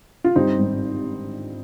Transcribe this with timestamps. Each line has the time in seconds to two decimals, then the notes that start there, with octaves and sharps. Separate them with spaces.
0.24 F4
0.36 G2 C4 D#4
0.59 G#1